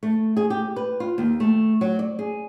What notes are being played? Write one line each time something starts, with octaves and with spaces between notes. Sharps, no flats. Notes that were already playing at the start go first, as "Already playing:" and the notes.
A3
G#4
G4
B4
F4
D#2
A3
F#3
D5
G#4